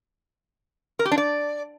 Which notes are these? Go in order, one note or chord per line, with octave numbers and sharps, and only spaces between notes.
A#4
G4
D4
D5